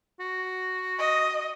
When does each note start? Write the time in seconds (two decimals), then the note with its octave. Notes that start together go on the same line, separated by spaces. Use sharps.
0.20 F#4
0.99 D#5